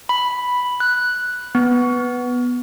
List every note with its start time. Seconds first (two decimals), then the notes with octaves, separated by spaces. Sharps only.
0.09 B5
0.80 F#6
1.55 B3